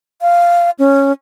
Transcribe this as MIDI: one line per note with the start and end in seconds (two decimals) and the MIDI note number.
0.22 0.70 77
0.79 1.12 61